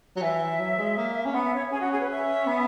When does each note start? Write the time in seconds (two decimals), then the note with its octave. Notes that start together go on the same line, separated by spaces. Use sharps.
0.16 F#3
0.21 E3 E5
0.59 F#3
0.78 G#3
0.97 A#3
1.25 C#4
1.34 B3 F#5
1.44 E5
1.53 C#5
1.72 C#4 G#4
1.81 F#4
1.91 G#4
2.00 B4
2.10 E5
2.47 B3